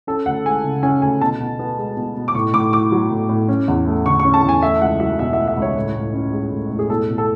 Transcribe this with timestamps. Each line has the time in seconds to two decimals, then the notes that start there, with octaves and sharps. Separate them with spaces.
0.07 C#4 A4
0.26 D2 F#5
0.45 G#3 G#5
0.64 C#3
0.83 C#4 G#5
1.02 D2 G#5
1.21 B2 A5
1.40 B2
1.59 B3
1.78 G#3
1.97 B2
2.16 B2
2.28 D6
2.35 A2 C#6
2.54 A2 D6
2.73 A3 D6
2.92 F#3
3.11 A2
3.29 A2
3.49 C#4
3.68 E2
3.86 A3
4.06 D3 C#6
4.20 C#4 C#6
4.34 A5
4.44 E2 G#5
4.62 A3 E5
4.81 C#2 F#5
5.00 F#3 E5
5.19 B2 E5
5.33 A3 E5
5.48 E5
5.57 C#2 C#5
5.76 A2
5.95 A2
6.14 C#4
6.33 G#3
6.52 A2
6.71 A2
6.79 G#4
6.90 B2 A4
7.09 B2
7.18 A4